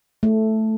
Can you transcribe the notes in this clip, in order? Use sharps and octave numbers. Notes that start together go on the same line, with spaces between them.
A3